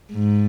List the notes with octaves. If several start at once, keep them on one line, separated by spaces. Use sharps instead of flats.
G#2